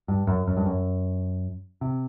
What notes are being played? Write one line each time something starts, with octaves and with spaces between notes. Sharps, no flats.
G2
F#2
F#2
G2
F#2
C3